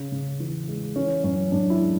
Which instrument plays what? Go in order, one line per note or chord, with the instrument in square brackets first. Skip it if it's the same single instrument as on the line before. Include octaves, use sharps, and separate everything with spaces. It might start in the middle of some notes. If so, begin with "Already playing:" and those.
Already playing: [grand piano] C#3
C#3
E3
G#3
E3 C#4
F#2 C#4
F#2 D4
E4
G#3